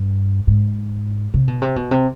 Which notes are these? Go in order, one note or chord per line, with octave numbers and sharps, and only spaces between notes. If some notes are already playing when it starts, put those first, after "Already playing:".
Already playing: G2
G#2
C3
B2
C3
B2
C3